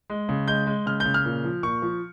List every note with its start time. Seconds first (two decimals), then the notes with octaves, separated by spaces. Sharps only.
0.10 G#3
0.29 C#3
0.48 G#3 G6
0.67 G#3
0.86 C#3 F6
1.00 G6
1.05 C#3
1.14 F6
1.25 A#2
1.44 F3
1.63 A#2 C#6
1.82 F3